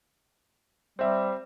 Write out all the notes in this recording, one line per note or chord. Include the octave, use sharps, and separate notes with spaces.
G3 C4 E5